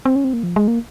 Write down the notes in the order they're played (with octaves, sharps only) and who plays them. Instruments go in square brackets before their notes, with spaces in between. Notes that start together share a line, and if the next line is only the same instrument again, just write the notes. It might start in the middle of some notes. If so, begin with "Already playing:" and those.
[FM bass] C4
C#4
C4
A#3
F3
G#3
A#3